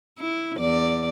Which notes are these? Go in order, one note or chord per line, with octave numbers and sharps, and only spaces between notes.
E4
E2 D5